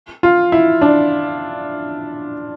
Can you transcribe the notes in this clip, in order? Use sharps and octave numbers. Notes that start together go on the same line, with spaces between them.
F4
E4
D4